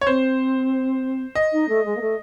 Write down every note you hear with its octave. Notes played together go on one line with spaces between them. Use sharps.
C#5
C4 C5
D#5
D#4
A3
G#3
A#3
A3